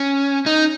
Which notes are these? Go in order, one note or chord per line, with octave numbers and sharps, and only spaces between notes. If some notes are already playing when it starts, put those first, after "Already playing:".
Already playing: C#4
D#4